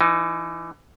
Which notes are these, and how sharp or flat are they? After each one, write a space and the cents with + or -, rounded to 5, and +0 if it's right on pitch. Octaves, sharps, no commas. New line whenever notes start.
E3 +25 D#4 +0